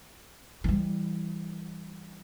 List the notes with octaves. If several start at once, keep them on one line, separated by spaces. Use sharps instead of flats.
E3 G3